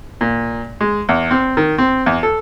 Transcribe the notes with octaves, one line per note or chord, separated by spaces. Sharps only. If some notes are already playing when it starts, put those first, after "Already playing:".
A#2
G#3
E2
C4
D#3
C4
E2
A4